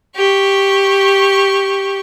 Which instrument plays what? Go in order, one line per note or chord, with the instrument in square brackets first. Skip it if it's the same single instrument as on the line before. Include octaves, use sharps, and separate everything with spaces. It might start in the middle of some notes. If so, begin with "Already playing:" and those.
[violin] G4 C#6